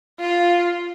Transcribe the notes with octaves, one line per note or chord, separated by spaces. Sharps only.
F4